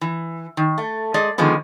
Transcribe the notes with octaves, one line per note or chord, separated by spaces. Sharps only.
E3
D#3
A3
G#3 G#4 D5 D#5
D3 D#3 F3 G#3 B3